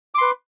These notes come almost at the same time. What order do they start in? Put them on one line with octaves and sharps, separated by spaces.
D6 C6 B4